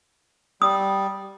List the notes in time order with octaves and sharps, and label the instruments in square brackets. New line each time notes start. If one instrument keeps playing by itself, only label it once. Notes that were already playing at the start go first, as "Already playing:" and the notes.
[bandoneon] G3 [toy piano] D#6